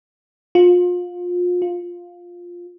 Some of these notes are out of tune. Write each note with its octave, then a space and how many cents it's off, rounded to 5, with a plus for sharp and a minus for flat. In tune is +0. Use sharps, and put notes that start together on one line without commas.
F4 +30
F4 +5